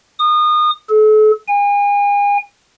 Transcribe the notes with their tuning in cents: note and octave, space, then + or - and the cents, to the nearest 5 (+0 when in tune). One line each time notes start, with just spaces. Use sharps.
D#6 -30
A4 -40
G#5 -35